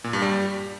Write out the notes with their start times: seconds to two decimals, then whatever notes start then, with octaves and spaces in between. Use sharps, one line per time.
0.04 A#2
0.13 G2
0.22 G3